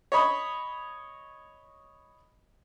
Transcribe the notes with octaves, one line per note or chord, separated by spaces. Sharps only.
C#5 D#5 B5 C#6